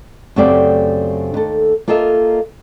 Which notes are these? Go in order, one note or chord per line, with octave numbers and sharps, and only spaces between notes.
F#2 C#3 A3 C4 G4 D5
D#2 A4
A#3 F4 A4 D#5 E5